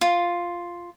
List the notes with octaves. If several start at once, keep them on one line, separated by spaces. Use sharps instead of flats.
F4